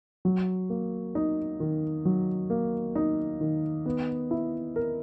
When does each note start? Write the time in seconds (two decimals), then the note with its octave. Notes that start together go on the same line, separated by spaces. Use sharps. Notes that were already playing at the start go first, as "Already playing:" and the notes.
0.25 F#3
0.70 A#3
1.15 D#4
1.60 D#3
2.05 F#3
2.50 A#3
2.95 D#4
3.41 D#3
3.86 B3
4.31 E4
4.76 A#4